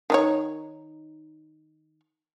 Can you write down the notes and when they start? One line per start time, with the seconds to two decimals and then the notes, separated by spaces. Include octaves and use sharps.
0.10 D#3 D#4 C#5